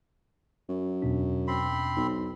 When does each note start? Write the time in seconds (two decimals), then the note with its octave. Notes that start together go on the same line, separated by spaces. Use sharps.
0.69 F#2
1.02 E2 B2 D4
1.48 C4 B5 C6
1.96 B1